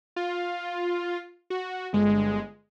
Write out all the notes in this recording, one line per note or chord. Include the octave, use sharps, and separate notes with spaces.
F4
F#4
G1 G#3